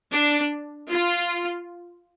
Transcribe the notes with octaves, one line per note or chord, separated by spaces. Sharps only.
D4
F4